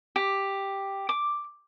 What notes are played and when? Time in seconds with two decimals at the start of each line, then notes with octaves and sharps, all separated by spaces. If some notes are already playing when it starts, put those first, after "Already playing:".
0.16 G4
1.09 D6